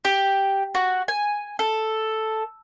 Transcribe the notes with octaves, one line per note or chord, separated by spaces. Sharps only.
G4
F#4
G#5
A4